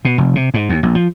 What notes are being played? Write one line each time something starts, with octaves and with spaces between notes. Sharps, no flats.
B2
F1
C3
G#2
D#2
A#1
F3